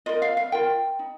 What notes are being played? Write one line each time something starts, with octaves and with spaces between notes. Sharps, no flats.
F4 A#4 D#5
F5
F5
F4 A#4 G5
D#4